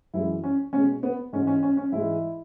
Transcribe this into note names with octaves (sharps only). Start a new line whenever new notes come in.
F#2 E3 G#3 E4
C#4
B2 G#3 C#4
B3
G#2 E3 G#3 C#4
C#4
C#4
C#4
G#2 E3 G#3 E4